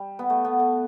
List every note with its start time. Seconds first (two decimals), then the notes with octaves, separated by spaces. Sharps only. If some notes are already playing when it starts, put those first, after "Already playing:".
Already playing: G3
0.19 B3
0.30 A3
0.45 B3
0.60 A3